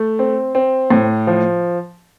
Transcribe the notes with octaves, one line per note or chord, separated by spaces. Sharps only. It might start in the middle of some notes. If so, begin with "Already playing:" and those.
Already playing: A3
C4
C4
A2
F3